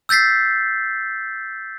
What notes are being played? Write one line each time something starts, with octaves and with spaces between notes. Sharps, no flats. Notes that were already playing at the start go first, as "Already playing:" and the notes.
E6 G6 A6 B6 C7